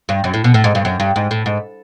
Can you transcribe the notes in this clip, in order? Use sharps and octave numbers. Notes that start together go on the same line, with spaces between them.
G2
F#2
A2
B2
A2
G#2
G2
F#2
G2
G#2
A2
G#2